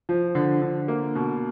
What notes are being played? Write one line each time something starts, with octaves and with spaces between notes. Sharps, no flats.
F3
D3
D3
A#3
B2